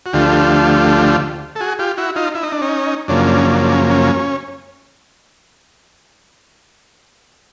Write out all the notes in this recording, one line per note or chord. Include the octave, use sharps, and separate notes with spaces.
F#4
D2 D3 F3 A3 F4 G4
A4
F#4 G#4
F4 G4
E4 F#4
D#4 F4
E4
D#4
D4
C#4 D#4
F#2 C#3 F3 A#3 D4
D4
C#4
D4
D4
C#4
C#4